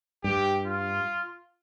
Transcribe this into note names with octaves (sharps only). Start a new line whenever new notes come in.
G2 G4
F4